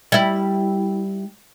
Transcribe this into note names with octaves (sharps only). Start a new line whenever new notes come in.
G3 E4